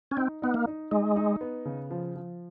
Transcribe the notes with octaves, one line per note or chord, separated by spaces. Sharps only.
C#4
C4 D#4
B3 D#4
A#3
D#4
G#3 D#4
D#4
B3
C#3
F3
F3